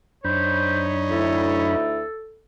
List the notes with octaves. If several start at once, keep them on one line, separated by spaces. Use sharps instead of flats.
F#2 D4 D#4 C5 C#5 B5
D2 E4 A4